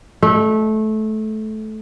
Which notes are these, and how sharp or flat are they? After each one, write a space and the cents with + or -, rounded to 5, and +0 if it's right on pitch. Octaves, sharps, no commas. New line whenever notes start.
A3 -20